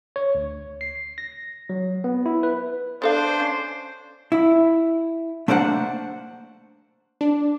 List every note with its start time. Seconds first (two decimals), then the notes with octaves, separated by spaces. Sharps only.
0.16 C#5
0.35 D2
0.81 C7
1.18 A#6
1.70 F#3
2.04 B3
2.26 E4
2.43 B4
3.02 B3 D4 A4 C5 F5
3.40 C#4
4.32 E4
5.48 A3 A#3 D4 C5 F#5
7.21 D4